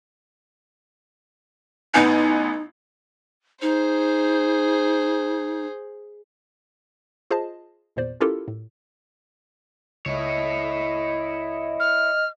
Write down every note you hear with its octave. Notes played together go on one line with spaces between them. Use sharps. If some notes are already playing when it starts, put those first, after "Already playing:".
A1 B3 D#4 G#5
D#4 G#4 C5
F4 G#4 C5 D#5 A5
G#1 E2 A#2 C5 D5
C#4 E4 F4 G4 A4 A#4
A2
C#2 E4 C#5 D#5
F6